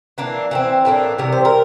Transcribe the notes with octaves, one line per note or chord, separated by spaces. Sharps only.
E3 A#3 D4
E3 A3 C4
A2 E3 A#3 D4
C3 E3 G3 A#4
C5
A#4